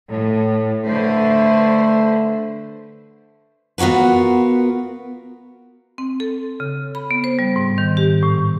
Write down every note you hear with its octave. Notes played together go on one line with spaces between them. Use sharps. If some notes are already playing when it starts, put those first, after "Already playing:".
A2
D3 A3 B4 C5
B3 F4 F#4 A#4 B4
C4
A4
C#3
B5
B3
C5
G3
G#2
D#3
G4
A2